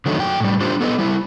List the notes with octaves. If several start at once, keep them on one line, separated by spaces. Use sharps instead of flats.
D3 D#3 F#3 A3
F#2 F#4 G5
A2 G3
D4 F4 G4 C5
B3 A4 B4 D#5
G3 E4